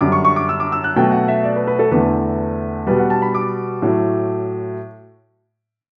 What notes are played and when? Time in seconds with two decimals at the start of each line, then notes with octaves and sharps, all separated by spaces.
0.01 F#2 D3 G3 D6
0.12 C#6
0.25 C#6
0.36 D6
0.49 E6
0.60 D6
0.72 E6
0.84 F#6
0.96 B2 F#3 A3 G5
1.12 F#5
1.28 E5
1.44 D5
1.56 B4
1.67 B4
1.79 A4
1.91 E2 D3 A3 B4
2.87 B2 G3 B4
2.99 F#5
3.10 A5
3.22 B5
3.35 D6
3.82 A2 F#3 A3